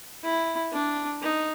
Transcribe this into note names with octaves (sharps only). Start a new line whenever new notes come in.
E4
D4
D#4